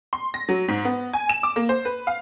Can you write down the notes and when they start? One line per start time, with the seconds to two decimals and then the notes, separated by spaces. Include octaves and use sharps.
0.13 C6
0.34 A#6
0.49 F#3
0.68 G#2
0.85 B3
1.13 G#5
1.29 E7
1.43 D6
1.56 A#3
1.69 C5
1.85 B4
2.07 F5